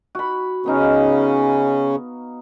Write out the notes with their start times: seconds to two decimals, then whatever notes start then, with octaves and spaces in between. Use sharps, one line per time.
0.15 F#4 B5
0.66 C#3 B3 C#4 D#4 F5